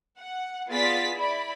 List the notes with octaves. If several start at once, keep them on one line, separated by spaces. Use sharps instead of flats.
F#5
B3 F4 G#4 D5 A6 B6
E4 D5 B5